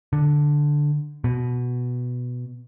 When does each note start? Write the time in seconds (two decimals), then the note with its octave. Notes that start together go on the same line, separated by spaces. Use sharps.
0.13 D3
1.24 B2